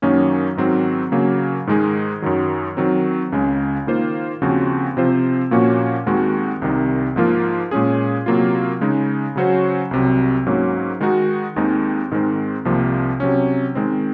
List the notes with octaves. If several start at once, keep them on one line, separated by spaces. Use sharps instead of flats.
F#2 D#3 F#3 A#3 C#4
G#2 D#3 F#3 C4
C#3 F#3 A#3
G#2 D#3 G#3 D#4 G#4
F#2 D#3 F#3
D#3 F#3 C4
C#2 C#3 G#3
D#3 A#3 F4 C5
D#2 C#3 F3 C4 F#4
C3 F3 C4 F4 C5
A#2 F3 A#3 C#4 F#4
D#2 D#3 G#3 C4 F#4
C2 C3 D#3
G#2 F3 A#3 F4 A#4
A#2 G#3 C#4 G#4
C3 F#3 A#3 F4
C#3 G#3 D#4
C#3 F#3 C#4 F#4 C5
C2 C3 F#3
G#2 F#3 A#3 C#4
D#3 G#3 D#4 F#4
D#2 D#3 G#3 C4 D#4
G#2 D#3 G#3 C4
C2 C3 F3 A#3
C3 F#3 C#4
D#3 G#3 C4